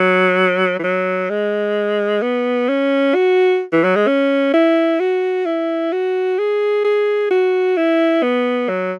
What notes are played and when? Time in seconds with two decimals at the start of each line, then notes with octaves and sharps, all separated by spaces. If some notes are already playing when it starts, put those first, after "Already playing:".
Already playing: F#3
0.79 E3
0.84 F#3
1.30 G#3
2.22 B3
2.69 C#4
3.15 F#4
3.73 E3
3.84 F#3
3.96 G#3
4.07 C#4
4.53 E4
5.00 F#4
5.46 E4
5.92 F#4
6.39 G#4
6.84 G#4
7.30 F#4
7.77 E4
8.23 B3
8.69 F#3